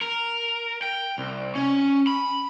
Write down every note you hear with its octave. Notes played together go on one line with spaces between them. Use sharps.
A#4
G5
C2
C#4
B5